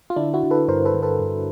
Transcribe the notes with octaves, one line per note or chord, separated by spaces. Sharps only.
F4
D3 D4 E4
E4 F#4
D3
A4 B4
G2 A#4 C5
A4 B4
D3
A4 B4
G2